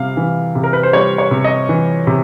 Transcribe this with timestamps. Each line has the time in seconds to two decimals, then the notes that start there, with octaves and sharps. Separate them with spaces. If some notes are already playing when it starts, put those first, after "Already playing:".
Already playing: C3 G3 F5
0.17 E3
0.55 C3
0.64 A#4
0.73 B4
0.83 C5
0.93 G3 C#5
1.18 C#5
1.31 C3
1.44 D#5
1.69 E3
2.07 C3